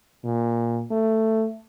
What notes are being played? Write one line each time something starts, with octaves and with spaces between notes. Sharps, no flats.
A#2
A3